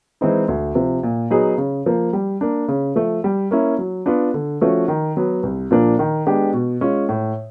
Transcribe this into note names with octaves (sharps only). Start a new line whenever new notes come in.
E3 G#3 C4 D#4
D2
C3 F3
A#2
F#3 B3 D#4 G#4
C#3
F3 A#3
G3
A#3 D4
C#3
F3 A3
G3
A#3 C#4 E4
F#3
B3 D4 F4
D3
F3 A3 C#4 F#4
D#3
F#3 B3
C2
A#2 F3 A#3 D4
D#3
G#3 B3 D4 G4
B2
G#3 C#4 F4
A2